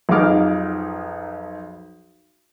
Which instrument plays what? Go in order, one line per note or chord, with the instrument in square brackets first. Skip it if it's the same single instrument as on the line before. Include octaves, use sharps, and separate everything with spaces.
[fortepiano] B1 F2 D#4 G#4 D6 F6